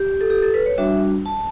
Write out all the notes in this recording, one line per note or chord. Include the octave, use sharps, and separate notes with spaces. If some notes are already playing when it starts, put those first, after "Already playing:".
Already playing: G4
A4
G4
A4
B4
C#5
G3 D4 F#4 E5
A5